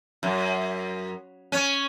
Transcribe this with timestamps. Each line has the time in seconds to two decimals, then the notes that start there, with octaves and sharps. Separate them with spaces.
0.23 F#2
1.52 C#4